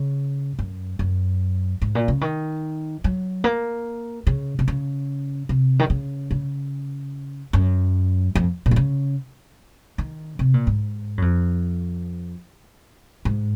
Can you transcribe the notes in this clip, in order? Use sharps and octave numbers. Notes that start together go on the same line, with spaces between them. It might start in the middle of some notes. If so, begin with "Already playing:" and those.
Already playing: C#3
F#2
F#2
G#2
A#2
C#3
D#3
F#3
A#3
C#3
C3
C#3
C3
D#3
C#3
C#3
F#2
F2
A#2
D#3
C#3
D#3
C3
A#2
G#2
F#2
F2
G#2